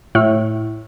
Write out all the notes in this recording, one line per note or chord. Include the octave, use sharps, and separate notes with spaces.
A2